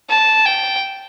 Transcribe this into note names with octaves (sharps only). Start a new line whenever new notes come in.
A5
G5